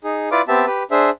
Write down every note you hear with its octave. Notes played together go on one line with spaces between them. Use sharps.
D#4 G#4
E4 F4 B4 D5 F5 D6
B3 C4 G4 E5 A5
G4 B4
D4 G#4 C5 E5